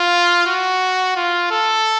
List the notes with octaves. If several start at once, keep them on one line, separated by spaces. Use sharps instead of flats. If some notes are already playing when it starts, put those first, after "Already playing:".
Already playing: F4
F#4
F4
A4